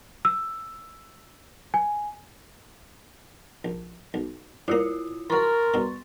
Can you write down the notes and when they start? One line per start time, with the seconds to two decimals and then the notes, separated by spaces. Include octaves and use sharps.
0.25 E6
1.74 G#5
3.65 A#1
4.14 B1
4.68 G2 A#3 E4 F4
5.30 E3 F#3 A#4 C6 C#6 A6
5.74 G2 B2